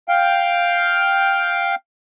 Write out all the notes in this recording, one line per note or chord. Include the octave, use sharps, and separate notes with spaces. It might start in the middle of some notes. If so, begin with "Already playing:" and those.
F5 G5